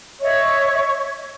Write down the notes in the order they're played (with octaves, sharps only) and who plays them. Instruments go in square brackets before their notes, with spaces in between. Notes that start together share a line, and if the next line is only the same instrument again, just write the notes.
[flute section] C#5 D#5 E5 C#6